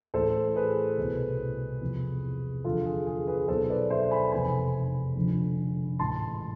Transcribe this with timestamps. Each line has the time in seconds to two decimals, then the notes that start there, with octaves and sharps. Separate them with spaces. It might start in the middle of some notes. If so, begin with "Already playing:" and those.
0.14 A1 A2 E3 A4 C5
0.56 G#4 B4
0.98 C2 B2
1.81 E2 C3 F3
2.64 E2 D3 F3 F4 A4
2.86 G#4
3.07 G#4
3.27 G#4 B4
3.48 B1 B2 A4 C5
3.70 B4 D5
3.90 C5 E5
4.11 G#5 B5
4.32 F1 E2 C3 G#5 B5
5.16 F1 F2 D3 F3
5.99 A1 G#2 E3 A5 C6